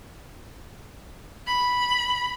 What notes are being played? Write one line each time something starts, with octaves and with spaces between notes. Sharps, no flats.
B5